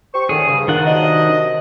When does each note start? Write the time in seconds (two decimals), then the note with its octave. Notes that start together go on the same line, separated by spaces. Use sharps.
0.14 G4 C5 C#6
0.29 A2 D3 D#3 G#4
0.48 G2 C#3
0.68 D#3 A#3 D4 F4 F#5
0.86 C3 F#3 D#5